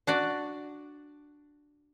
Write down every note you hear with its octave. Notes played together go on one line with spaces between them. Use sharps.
D4 F#4 D5